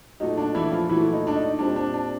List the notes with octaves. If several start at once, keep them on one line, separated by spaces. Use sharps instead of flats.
A#2 F#3 A3 D#4
D4
E3 E4
F3 F4
A#2 E3 F#3 A3 E4
D#4
D4
D#4
A#2 G3 C4 D4
D4
D4